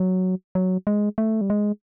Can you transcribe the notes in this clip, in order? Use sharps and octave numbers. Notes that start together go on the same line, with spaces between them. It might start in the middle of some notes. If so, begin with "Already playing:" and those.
Already playing: F#3
F#3
G#3
A3
G3
G#3